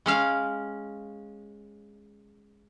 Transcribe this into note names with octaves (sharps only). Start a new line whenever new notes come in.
G#3 C#4 F5